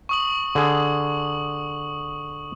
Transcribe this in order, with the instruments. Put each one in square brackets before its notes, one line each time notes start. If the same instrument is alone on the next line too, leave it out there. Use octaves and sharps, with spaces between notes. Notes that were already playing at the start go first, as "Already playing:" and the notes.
[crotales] C#6 D#6 F#7
[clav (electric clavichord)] D3 G#4